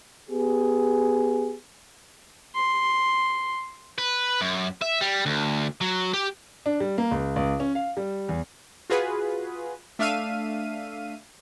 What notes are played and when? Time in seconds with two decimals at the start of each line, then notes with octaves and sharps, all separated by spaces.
0.29 B3 G4 G#4
2.55 C6
3.98 B4
4.41 F#2
4.82 E5
5.01 G3
5.26 D2
5.81 F#3
6.13 G4
6.66 D4
6.80 G3
6.98 A#3
7.11 C#2
7.36 C#2
7.60 C#4
7.75 F5
7.97 G3
8.29 E2
8.90 F4 F#4 G#4 B4
9.99 A3 D4 E5 F5 D#7